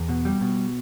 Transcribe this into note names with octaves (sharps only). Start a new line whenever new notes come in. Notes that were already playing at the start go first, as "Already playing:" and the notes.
Already playing: E2
B2
G3
B2